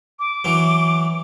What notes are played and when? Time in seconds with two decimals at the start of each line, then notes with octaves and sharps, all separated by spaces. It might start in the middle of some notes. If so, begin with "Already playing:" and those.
0.19 D6
0.44 E3 F#3